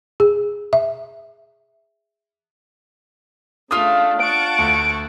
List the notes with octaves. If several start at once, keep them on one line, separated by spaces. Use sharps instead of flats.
G#4
E5
C#3 A3 D4 F4 F5 D#6
F#5 A5 C#6 D7
D2